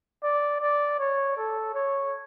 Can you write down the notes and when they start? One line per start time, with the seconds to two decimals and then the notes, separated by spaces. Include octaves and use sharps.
0.23 D5
0.61 D5
0.99 C#5
1.37 A4
1.75 C#5